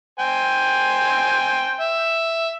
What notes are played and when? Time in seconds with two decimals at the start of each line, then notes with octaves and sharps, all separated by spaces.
0.19 C5 G5 G#5
1.80 E5